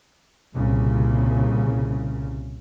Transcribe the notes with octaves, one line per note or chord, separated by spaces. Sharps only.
C2 A#2 C#3